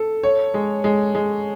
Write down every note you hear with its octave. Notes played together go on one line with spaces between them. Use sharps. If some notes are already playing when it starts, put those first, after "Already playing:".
Already playing: A4
C#5
G#3
G#3
G#3